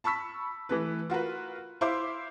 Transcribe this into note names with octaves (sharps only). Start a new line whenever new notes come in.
A5 B5 C#6 E6 B6
E3 A3 B4
F4 F#4 A#4 B4
E4 C5 E5 F5 C6 D6